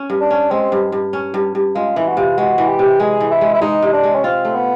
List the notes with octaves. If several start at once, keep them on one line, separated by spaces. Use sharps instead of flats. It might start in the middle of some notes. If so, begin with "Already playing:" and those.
Already playing: C#4
G2
D4
C#4
G#3 C4
G2
G2
C#4
G2
G2
G#3 F4
E3 E4
F#4
C3 F4
G#3 F#4
E3
G4
C3
G#3 G#4
E3
E4
G#3
E4
G#3 D#4
C3 D#4
D4
G#3
C#4
C4 F4
A3
B3